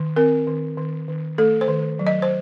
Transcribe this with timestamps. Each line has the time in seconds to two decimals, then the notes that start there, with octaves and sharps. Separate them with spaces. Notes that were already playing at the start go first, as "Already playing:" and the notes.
Already playing: D#3
0.16 C4 A#4
0.47 D#3
0.77 D#3
1.08 D#3
1.38 A3 A4
1.61 C5
1.68 D#3
1.99 F#3
2.07 D#5
2.22 C5